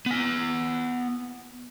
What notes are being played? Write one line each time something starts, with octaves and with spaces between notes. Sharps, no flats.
B3 G#5